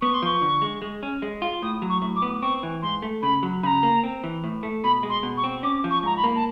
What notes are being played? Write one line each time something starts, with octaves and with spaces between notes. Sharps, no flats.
B3 C#6
C6
F3 C#6
D3
G#3
G#3
C#4
G#3
F4
A2 D#6
F#3
C#6
A2
D6
B3
C4 C#6
E3
G#2 C6
A3
C#3 B5
F#3
C#3 A#5 B5
A#3
C4
E3
A2
A3
B2 B5
G#3
C6
B2
C#6
C4
C#4 D6
F3
C#6
G#2 A#5
B5
A#3
A5